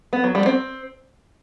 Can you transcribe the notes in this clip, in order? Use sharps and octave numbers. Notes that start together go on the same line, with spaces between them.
B3
F#3
G3
C4